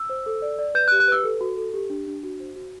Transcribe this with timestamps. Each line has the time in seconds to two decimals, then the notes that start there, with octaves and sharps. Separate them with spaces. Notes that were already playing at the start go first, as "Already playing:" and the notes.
Already playing: E6
0.09 C5
0.26 A4
0.42 D5
0.59 D5
0.75 B4 G6
0.88 F#6
0.92 G4
1.00 F#6
1.08 B4 E6
1.24 A4
1.41 F#4
1.57 A4
1.74 G4
1.90 D4
2.07 D4
2.23 F#4
2.40 C5
2.56 F#4